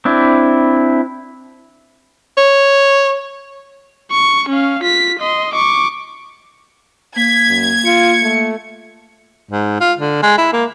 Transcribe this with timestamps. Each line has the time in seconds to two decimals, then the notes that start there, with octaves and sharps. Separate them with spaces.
0.05 C4 D4 E4
2.37 C#5
4.11 C#6
4.49 C#4 F5
4.83 F4 B6
5.19 D#5 C6
5.54 C#6 D6
7.16 A#3 G#6 B6
7.48 F#2
7.85 F4 C#7
8.22 A3
9.51 G#2
9.80 F4
9.98 D3
10.22 G#3
10.38 E4
10.53 A#3